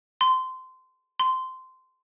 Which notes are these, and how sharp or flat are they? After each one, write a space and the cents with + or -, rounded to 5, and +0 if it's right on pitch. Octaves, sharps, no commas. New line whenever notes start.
C6 -20
C6 -15